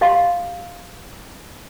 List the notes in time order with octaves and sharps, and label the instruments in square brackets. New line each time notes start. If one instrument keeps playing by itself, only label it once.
[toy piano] G4 D#5 F5 A#5 C6